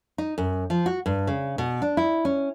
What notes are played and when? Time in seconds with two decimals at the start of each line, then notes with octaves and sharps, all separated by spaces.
0.18 D#4
0.38 F#2
0.70 F3
0.86 F#4
1.06 G2
1.27 C#3
1.58 B2
1.82 D4
1.97 E4
2.25 C#4